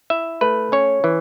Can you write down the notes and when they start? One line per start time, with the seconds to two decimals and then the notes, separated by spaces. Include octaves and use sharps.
0.10 E4 E5
0.41 A3 B4
0.72 C#4 C#5
1.04 E3